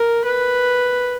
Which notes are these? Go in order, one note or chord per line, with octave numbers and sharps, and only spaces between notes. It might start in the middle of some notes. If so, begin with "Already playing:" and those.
Already playing: A#4
B4